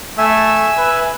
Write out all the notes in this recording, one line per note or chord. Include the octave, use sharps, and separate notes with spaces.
A3 E5 G#5 E6
B4